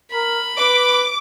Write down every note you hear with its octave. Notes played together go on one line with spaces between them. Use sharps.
A#4 B5
B4 D6